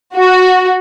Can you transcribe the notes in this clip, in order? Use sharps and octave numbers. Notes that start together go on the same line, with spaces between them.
F#4